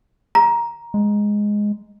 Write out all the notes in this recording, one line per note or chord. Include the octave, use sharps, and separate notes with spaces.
A#5
G#3